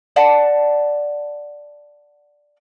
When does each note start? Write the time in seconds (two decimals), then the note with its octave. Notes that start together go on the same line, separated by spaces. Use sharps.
0.16 D5 F#5 A5